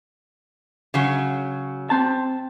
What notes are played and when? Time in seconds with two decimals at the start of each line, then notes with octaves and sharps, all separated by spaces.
0.94 C#3 F#3
1.90 C4 A5